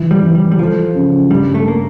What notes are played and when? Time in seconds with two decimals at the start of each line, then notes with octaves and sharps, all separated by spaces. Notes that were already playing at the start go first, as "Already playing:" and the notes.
Already playing: E3 F3
0.11 G3
0.23 E3
0.35 G3
0.52 G3
0.59 F3 A4
0.94 C#3
1.30 G2 G3
1.55 A3
1.68 A#3